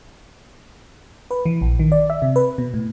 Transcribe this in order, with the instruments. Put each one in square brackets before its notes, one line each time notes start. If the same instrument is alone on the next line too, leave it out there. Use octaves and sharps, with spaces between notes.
[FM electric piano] B4
E3
A#1
D#3
D5
E5
C3
B4
B2
A2